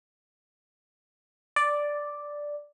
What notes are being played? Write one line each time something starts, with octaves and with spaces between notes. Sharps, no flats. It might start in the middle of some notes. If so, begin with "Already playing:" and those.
D5